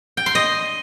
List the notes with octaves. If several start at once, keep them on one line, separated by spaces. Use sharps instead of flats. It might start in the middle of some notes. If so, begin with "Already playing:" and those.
G5
C6
D#5